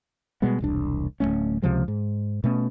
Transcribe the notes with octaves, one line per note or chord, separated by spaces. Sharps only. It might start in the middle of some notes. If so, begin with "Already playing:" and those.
B2 G3 G#3 B3
E1 C2 D4
D1 F#2 A3 C#4
C#2 C3 F3 G#3
G#2
B2 A3 C#4